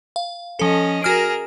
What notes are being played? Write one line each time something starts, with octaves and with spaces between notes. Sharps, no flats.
F5
F3 C#4 A4 D#5
F#4 G#4 A#4 F6 D7